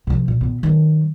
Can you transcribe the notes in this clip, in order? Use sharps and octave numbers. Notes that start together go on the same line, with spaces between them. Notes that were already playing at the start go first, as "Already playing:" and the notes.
C3 F3
A#2
A#2 B3
D#3 F#3